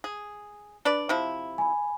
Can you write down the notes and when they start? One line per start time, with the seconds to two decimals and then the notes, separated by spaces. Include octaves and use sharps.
0.04 G#4
0.85 D4 B4 D5
1.09 C3 F3 E4
1.58 G#5 B5